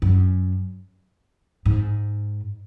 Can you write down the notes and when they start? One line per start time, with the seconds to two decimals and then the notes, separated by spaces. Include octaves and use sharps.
0.02 F#2
1.65 G#2